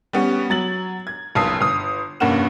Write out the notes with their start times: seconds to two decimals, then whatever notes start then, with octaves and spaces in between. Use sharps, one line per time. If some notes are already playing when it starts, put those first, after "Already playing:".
0.13 G3 B3 C#4
0.50 F#3 A6 F#7
1.07 G#6
1.35 F#1 B1 A5 D#6 C7
1.61 G1 D#6
2.20 F1 G2 A#3 C#4 F#5 E7